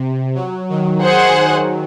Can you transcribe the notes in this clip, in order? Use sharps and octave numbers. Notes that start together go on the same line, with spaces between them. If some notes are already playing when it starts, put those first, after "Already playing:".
Already playing: C3
F#3
D#3
G#4 C5 F#5